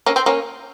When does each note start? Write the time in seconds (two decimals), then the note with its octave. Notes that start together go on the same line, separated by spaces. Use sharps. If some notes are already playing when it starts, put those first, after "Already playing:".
0.06 A#3 C#4
0.16 C4
0.26 A#3 C#4